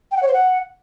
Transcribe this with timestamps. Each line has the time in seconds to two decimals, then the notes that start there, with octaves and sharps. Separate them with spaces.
0.11 G5
0.16 F#5
0.22 C#5
0.27 C5
0.33 F#5